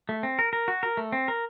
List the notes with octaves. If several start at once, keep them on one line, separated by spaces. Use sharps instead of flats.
A3
C4
A#4
A#4
F#4
A#4
A3
C4
A#4